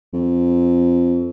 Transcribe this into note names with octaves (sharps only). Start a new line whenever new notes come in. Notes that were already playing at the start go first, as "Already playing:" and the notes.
F2